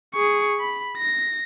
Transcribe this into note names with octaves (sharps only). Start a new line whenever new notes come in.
G#4 C#6
B5
A#6